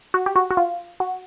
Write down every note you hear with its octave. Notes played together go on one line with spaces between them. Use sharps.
F#4
G4
F#4
F#4
F4
F#4